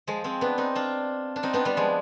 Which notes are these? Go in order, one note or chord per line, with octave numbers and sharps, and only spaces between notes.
F3 G#3
G#3 C4
B3 D4
C4 D#4
D4 F4
D4
C4 D#4
B3 D4
G3 B3
F3 G#3